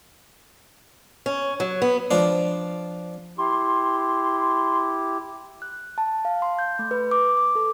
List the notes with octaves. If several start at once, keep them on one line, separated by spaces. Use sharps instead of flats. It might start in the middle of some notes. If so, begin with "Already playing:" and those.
C#4
F#3
B3
F3 D4
E4 G4 C6
F#6
A5
F5
C6
G6
A3
B4
D6
D6
A4